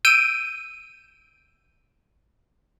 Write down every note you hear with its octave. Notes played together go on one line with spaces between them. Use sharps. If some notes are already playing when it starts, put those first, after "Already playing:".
E6 G6 D7 D#7